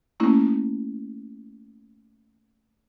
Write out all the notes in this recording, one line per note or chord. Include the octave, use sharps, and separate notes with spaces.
A3 A#3 C#4 E4